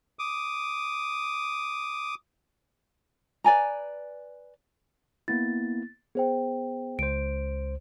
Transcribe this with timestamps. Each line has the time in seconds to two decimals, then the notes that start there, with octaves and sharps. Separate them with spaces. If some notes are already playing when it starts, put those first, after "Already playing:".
0.19 D6 D#6
3.44 B4 D5 G#5 A#5
5.28 A#3 B3 E4 A6
6.15 B3 G#4 C5 G5
6.99 C#2 C5 D7